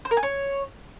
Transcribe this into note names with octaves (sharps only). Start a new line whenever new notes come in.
C5
A#4
G#5
C#5